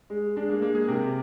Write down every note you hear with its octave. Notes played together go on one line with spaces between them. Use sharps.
G#3
G#3 D4
A#3
G#3 A#3
G#4
C3 A#4